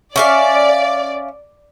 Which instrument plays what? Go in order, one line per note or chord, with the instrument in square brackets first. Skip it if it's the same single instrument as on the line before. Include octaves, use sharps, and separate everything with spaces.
[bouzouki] C#4 E5 F5 [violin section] D5